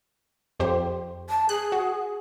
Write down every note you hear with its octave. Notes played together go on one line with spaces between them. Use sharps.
F2 G4 C5
A5
G#4 F#6
F#4